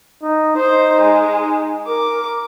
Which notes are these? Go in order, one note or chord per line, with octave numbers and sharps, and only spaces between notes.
D#4
D#4 C5
G#3
D#4
A#4 D6